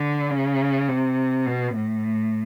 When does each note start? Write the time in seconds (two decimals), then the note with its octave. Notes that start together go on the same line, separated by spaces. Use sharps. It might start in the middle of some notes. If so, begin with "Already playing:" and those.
Already playing: D3
0.31 C#3
0.89 C3
1.47 B2
1.75 A2